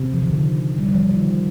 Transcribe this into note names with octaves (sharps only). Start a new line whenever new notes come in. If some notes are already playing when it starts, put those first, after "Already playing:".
Already playing: C3
F3
D#3
D3
G3
G3
F3
D#3